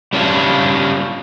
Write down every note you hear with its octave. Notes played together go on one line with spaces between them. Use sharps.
G3 C#4 D4 F4